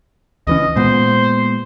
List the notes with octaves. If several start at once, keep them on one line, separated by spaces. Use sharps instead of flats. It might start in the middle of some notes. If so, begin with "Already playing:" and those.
C#2 E3 C#4 D#5
A#2 G#3 B3 C5